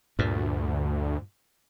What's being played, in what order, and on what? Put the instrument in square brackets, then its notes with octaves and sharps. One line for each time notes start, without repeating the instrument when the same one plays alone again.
[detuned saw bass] D2 [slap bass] G2 A#2